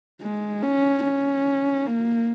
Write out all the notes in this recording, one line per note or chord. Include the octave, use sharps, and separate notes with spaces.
G#3
C#4
C#4
A#3